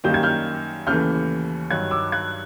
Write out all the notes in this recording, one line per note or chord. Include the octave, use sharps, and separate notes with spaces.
F#2 D#3 G3 A#3 G6
G#6
F6 G6
D#2 C#3 E3 A3 F6 G6
G2 D#3 F#3 F#6 G#6
D6 E6
F#6 G#6